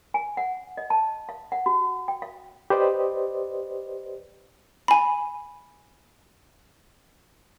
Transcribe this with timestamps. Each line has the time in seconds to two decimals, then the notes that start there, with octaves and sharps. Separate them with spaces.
0.14 G#5
0.37 F#5
0.77 D#5
0.90 A5
1.29 F5
1.52 F#5
1.66 F#4
2.08 G5
2.22 F5
2.70 G4 B4 C5 D5 D#5
4.88 G#5 B5